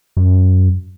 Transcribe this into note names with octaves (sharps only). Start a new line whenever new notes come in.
F#2